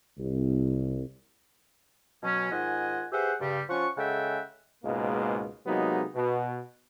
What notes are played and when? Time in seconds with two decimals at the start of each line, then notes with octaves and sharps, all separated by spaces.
0.17 C2
2.23 B2 F#3 C#4
2.52 G#2 D#3 F4 D#5 F#5 G#5
3.12 G4 G#4 B4 C5 E5 F#5
3.41 G2 C#3 G3
3.69 F3 C#4 F4 F#5 C#6
3.97 C#3 G#3 A4 E5 F#5 G5
4.84 C#2 G#2 B2 G#3 A#3
5.67 C3 F#3 G#3 A#3 B3 D#4
6.15 B2